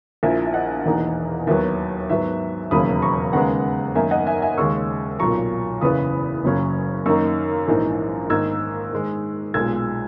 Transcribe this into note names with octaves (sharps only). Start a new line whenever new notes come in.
A#1 A#2 A#3 E4 E5 G#5
E5
D#5 F#5
E1 E2 D#3 A#3 D#4
D#2 D#3 F#3 B3 E5
G#2 F#3 B3 E5
E1 D#2 C#3 F#3 A#3 B5 D#6
A#5 C#6
D#2 C#3 G#3 B3 F#5 A#5
F#2 D#3 A#3 D#4 E5 G#5
D#5 F#5
E5 G#5
E5 G#5
D#2 C#3 G#3 C#4 C#6 E6
B1 A#2 F#3 A#5 C#6
F#1 E2 C#3 E3 B3 B5 D#6
F#1 F#2 C#3 F#3 C#4
F#2 D#3 A#3 D#4 C#6 E6
A#1 G#2 E3 A#3 D#4
G#2 D#3 A#3 D#4 E6 G#6
G#2 D#3 G#3
B1 A#2 G#3 E6 G#6